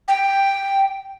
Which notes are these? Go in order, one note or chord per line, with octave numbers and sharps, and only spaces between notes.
G5